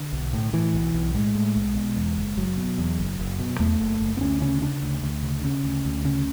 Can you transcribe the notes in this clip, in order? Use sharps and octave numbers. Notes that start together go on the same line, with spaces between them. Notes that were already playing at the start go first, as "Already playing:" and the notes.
Already playing: D3
B1
A2
A2 E3
B1
B1
A2 G#3
A2
B1
B2
E2
F#1
F#1 F#3
B2
E2
F#1
F#1
B2
E2 A3
F#1
F#1
B3
D2 C#4
C#3 C#4
C#3 D4
D2
D2
C#3
C#3 C#4
D2
D2
C#3 C#4